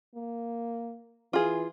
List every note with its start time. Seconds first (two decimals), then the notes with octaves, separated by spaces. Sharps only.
0.15 A#3
1.33 E3 F4 G#4